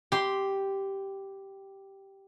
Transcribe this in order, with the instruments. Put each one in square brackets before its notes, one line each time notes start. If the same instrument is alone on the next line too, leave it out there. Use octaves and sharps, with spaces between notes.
[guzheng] G4 C6